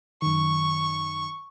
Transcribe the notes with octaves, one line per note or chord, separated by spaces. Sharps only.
F#2 D#3 C#6